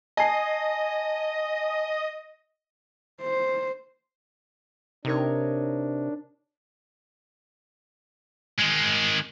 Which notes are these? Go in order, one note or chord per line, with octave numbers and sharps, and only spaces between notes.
D#5 G#5 A5 C7
C5
C3 D4 D#4 A#4 C#5
D#3 G#3